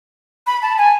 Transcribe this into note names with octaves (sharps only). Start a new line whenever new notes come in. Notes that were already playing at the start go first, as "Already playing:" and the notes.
B5
A5
G#5